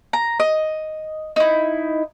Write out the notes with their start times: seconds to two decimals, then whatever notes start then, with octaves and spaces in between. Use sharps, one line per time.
0.13 A#5
0.40 D#5
1.36 D#4 E4